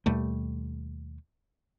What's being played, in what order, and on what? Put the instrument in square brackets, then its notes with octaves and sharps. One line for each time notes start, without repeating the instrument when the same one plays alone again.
[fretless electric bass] D#2 B2 G3 A3